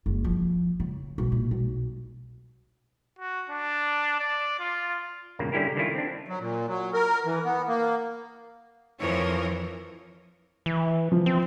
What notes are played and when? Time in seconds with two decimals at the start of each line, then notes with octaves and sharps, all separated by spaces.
0.06 F#1
0.24 F3
0.80 C#3
1.18 B1
1.32 A#2
1.51 B1
3.19 F#4
3.49 D4
4.19 D5
4.60 F4
5.39 E2 G2 A#2 C#3 A#3
5.52 D3 G3 C#4 E4 G4 A#4
5.76 D3 D#3 G3 C#4 E4 F4
5.95 C4 D4
6.26 F#3
6.40 A#2
6.68 F#3
6.93 A#4
7.25 E3
7.45 B3
7.68 A#3
8.99 F2 E3 F3 A#4 C#5
10.66 E3
11.12 F3
11.26 C4